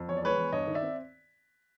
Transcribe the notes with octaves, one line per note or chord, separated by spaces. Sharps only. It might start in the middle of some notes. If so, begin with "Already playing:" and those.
Already playing: F2
E2 C#5
D5
G#3 B4 C#5
E2
G2 C#5 D#5
D#3
D5 E5
C4